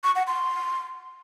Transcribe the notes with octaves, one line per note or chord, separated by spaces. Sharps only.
C#6
F#5
C6